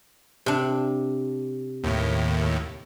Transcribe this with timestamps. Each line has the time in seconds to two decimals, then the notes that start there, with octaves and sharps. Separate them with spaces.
0.46 C3 D4
1.84 D#2 A2